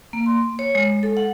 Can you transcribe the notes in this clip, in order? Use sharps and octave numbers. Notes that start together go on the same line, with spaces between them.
A#3
C6
C#5
G#3
A4
F#5